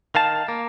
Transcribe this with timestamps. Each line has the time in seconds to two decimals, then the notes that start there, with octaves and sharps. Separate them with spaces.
0.15 D#3 F5 A5
0.48 A#3